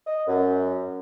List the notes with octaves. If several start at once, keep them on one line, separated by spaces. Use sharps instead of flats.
D#5
F#2